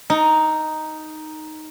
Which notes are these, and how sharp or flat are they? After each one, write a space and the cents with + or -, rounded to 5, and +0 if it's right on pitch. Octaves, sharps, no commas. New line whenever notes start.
D#4 +0 A#4 -45